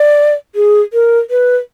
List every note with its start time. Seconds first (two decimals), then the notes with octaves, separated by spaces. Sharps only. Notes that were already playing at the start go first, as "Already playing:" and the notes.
Already playing: D5
0.55 G#4
0.93 A#4
1.30 B4